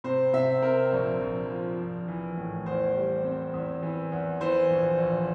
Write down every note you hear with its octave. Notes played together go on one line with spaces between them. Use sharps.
C3 C5
C3 E5
C4 A#4
A#1
A#1
F3
A#1
E3
A2
E2 C5
G3
C4
E2
E3
E2
E3 C5
A#1
A#1